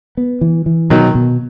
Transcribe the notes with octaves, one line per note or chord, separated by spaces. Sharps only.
B3
E3
E3
B2 D#3 F#3
B2